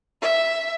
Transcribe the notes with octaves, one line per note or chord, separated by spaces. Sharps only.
E5